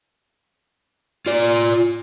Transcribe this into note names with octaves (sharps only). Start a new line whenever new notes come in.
F4 D5